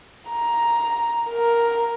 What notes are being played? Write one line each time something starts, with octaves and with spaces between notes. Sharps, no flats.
A#5
A#4